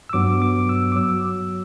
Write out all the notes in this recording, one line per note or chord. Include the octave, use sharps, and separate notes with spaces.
E6
G2 F#3 B3 D6
D6
E6
D6
F#3 E6